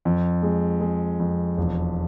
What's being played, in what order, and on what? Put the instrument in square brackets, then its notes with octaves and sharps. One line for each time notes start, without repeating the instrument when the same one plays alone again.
[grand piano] F2
G#3
G#3
F2
E1